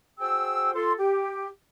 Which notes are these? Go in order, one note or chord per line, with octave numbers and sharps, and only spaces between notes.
F#4 G#4 C5 G5 E6
F4 A4 C6
G4